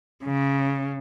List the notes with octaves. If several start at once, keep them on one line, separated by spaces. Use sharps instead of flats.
C#3